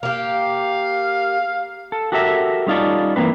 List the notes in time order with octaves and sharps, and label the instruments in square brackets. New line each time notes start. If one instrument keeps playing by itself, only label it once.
[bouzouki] A#3 G4 [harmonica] F5
[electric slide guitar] A4
F#4 G4 A4 A#4 D5 E5
G3 C#4 D#4 F4 A4 D5
E3 A#3 C4 B4